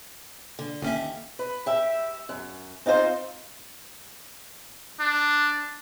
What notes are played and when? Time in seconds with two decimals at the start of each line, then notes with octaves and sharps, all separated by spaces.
0.59 D3
0.82 G1 D#2 C#4 E5
1.39 B4
1.66 G4 E5
2.29 F#2
2.86 C4 D#4 F4 C5
5.00 D4